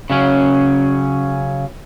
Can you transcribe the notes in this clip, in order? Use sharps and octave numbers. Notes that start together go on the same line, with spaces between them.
C#3 F#3 C#4